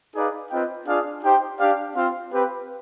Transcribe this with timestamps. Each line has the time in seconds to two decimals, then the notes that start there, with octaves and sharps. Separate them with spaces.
0.14 D#4 G#4 B4 D5 F5
0.51 C4 F4 B4 D#5 G5
0.87 D4 F4 G#4 D5 F5
1.23 D#4 G4 C5 G5
1.59 D4 G4 D5 F5
1.95 C4 F4 C5 F5
2.31 C4 G4 B4